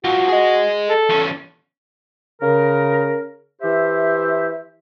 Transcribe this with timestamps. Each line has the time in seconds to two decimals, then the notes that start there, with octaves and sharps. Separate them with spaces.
0.05 F#3 F4 F#4
0.28 G#4 D#5
0.89 A4
1.10 E2 C#4
2.41 C#3 A#4
3.62 E3 G4 C5 E5